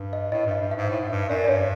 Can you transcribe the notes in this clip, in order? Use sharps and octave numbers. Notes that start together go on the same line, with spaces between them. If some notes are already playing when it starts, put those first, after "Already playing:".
Already playing: G2
D#5
A2 D#5
G2
E5
G2
G#2 E5
A2 E5
G#2
G2 E5
F#2 D5
D5
G2 C#5